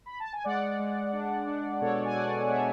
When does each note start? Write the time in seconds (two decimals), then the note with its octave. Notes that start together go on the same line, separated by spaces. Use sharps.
0.06 B5
0.20 A5
0.32 G#5
0.44 G#3 D5 F#5
0.79 G#3
1.12 D4
1.47 D4
1.81 B2 A4 C#5
2.05 G#5
2.15 B2 D5 F#5
2.44 F#5
2.49 G#3 C#5 E5